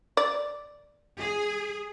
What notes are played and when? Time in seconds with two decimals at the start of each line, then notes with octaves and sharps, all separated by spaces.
0.17 D5
1.19 G#4